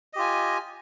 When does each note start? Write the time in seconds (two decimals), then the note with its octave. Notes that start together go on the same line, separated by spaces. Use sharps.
0.13 D#5
0.16 G4
0.18 F4
0.21 G#5